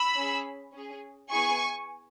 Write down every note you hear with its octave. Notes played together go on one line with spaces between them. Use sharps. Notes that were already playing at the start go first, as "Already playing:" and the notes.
Already playing: B5 E6
C#4 G#4
C#4 G#4
B3 E4 G#4 G#5 C#6